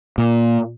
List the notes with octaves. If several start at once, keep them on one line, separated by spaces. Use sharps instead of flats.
A#2